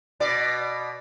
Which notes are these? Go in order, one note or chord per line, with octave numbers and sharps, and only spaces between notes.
B2 D5